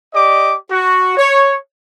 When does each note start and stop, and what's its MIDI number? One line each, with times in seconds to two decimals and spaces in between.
0.14 0.55 67
0.14 0.55 74
0.14 0.55 75
0.14 0.55 86
0.71 1.17 66
1.17 1.56 73